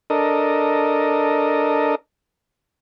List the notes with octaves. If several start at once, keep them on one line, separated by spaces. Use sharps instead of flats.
D4 A4 A#4 D#5